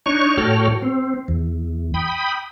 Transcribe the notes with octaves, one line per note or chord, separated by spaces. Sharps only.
D4 D#4 C#5 C#6
A2 F#4 A4 C#5 G5 F6
C4
E2
G5 B5 D#6